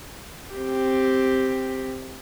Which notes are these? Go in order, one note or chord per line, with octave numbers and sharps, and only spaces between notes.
C4 G4